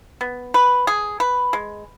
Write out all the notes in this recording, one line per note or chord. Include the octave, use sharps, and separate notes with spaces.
B3
B4
G#4
B4
G#3